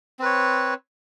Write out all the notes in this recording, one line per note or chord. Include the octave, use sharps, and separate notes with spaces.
C4 B4 C#5